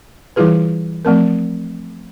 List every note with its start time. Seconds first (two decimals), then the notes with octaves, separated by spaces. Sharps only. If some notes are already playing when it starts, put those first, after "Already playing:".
0.36 E3 G3 E4 F4 G#4 B4
1.05 F3 A3 C4 A#4